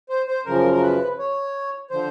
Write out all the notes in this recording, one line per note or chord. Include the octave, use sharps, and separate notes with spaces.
C5
C5
F#2 C#3 F3 A#4
A#4
B4
C#5
D3 F3 C5